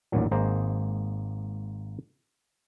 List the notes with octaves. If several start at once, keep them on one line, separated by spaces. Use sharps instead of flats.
A1 D#2 A#2 F#3
G#1 A#3 G#4 C5 D#5 A#5